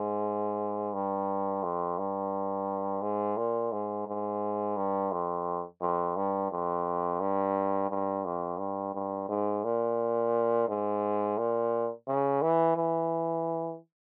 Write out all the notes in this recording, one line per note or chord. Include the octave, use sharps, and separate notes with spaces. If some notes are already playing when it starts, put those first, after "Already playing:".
Already playing: G#2
G2
F2
G2
G#2
A#2
G#2
G#2
G2
F2
F2
G2
F2
G2
G2
F2
G2
G2
G#2
A#2
G#2
A#2
C#3
E3
E3